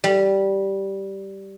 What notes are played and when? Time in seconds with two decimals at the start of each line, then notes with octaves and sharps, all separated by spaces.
0.04 G3